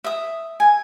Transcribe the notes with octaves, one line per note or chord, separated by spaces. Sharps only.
E5 D#6
G#5